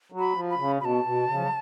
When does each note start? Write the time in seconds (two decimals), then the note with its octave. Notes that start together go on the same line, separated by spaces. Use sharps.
0.12 F#3
0.19 B5
0.34 F3
0.50 B5
0.57 C#3
0.80 B2 A5 B5
1.04 B2
1.27 C#3
1.35 F3
1.43 F#3